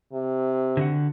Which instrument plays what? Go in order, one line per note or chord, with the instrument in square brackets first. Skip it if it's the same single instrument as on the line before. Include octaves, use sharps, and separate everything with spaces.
[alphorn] C3
[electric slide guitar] D3 F#4 F#5